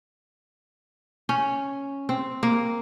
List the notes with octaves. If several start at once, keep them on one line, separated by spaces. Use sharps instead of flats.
C#4
C4
A#3